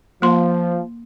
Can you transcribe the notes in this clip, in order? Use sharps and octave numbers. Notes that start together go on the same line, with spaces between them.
F3 A#3 C6